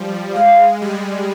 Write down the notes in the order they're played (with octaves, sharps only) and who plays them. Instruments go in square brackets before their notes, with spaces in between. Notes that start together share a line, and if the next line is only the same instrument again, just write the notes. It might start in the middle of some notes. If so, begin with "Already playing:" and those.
Already playing: [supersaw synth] F3 G3
[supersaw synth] G#3 [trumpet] F5
[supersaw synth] G3